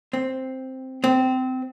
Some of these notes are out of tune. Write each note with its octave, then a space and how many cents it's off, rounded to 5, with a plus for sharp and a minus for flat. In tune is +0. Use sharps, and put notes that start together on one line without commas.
C4 +0
C4 -20